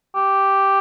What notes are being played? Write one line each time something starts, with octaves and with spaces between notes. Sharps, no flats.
G4